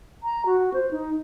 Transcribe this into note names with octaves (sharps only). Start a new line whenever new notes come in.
A#5
F#4
C5
D#4